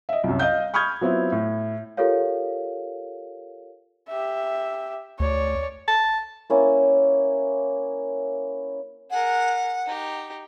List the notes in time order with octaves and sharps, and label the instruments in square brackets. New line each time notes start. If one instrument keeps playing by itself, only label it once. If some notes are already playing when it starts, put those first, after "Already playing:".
[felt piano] D#5 E5
C2 F#2
D#5 F5 G6
B5 C#6 D#6 F6 G6 G#6
F#3 B3 C4 E4 F4
A2
[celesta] F4 G4 A4 A#4 C#5 F5
[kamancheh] G4 E5
[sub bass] D2 [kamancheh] C#5 D5
[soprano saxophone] A5
[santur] A#3 C#4 E4
[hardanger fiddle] G#4 A#4 [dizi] F#5
[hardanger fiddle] D#4 G4